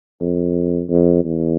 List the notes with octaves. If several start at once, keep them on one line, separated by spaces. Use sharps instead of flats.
F2
F2
E2